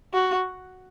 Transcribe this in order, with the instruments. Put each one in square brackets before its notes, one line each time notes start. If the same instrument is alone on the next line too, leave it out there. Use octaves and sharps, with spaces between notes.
[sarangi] F#4